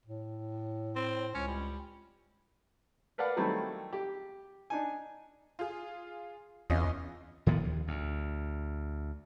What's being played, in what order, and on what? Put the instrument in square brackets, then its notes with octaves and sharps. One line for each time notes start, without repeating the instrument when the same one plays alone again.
[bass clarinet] A2
[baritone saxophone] C4
[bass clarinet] C#2 [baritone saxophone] C#4
[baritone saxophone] G3
[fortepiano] A#4 B4 D5 F5 F#5
D#3 F#3 G3 A3 C4 E4
G4
D4 D#4 G#5
[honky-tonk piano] F4 G#4
[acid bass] E2 [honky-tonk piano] C#4 F4 D#5
[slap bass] A2 D#3 F3 B3
D#2
D2